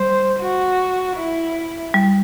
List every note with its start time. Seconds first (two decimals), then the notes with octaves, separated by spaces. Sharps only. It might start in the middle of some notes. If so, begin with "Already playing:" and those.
Already playing: G3 C5
0.39 F#4
1.16 E4
1.94 G3